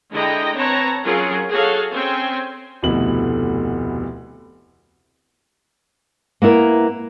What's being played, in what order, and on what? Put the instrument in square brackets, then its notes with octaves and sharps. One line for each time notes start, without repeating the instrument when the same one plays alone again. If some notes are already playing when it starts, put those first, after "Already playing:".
[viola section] D3 G#3 E4 D#5 G5 A#5
C4 B4 C#5 A5 A#5
F#3 C#4 F4 G#4 A#4
F#4 G#4 A4 C#5 F5
C4 C#4 G5 G#5
[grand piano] F1 D2 B2 A3 E4 F#7
[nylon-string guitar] A#3 B3 E4 A#4